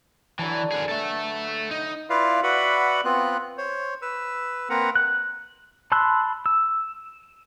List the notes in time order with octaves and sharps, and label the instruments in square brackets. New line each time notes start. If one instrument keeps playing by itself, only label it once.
[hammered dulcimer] D3 F#3 A5 [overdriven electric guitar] E3
[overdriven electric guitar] G#4 A#4 [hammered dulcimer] B4 F#5
[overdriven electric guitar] A4 E5
D#4
[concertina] E4 F4 B4 D5 F5
F#4 B4 D5 E5 F#5 B5
B3 C4 F4 F#6
C5 C#5
B4 E6
A#3 C4 A#4 B4 F#5 A#5
[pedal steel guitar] F#6
A5 B5 C6 E6 F#6
E6